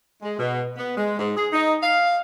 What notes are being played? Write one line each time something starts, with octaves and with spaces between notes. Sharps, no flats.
G#3
B2
B3
G#3
G#2
G#4
D#4
F5